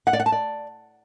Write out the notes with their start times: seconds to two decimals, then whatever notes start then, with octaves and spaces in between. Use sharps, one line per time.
0.07 F#5
0.13 D5
0.20 F#5
0.26 A5
0.32 D5